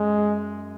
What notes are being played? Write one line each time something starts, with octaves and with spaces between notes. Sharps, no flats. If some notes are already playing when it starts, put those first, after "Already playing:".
Already playing: F#2 G#3